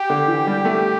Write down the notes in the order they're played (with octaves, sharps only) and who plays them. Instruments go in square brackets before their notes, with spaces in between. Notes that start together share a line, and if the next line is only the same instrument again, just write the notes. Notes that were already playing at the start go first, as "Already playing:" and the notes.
Already playing: [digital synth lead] G4
[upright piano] D3
E3
G3
A3